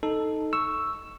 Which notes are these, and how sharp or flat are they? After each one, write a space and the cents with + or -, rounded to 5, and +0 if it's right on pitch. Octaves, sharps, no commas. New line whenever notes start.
D#4 +0 A4 +0
C#6 +0 E6 +5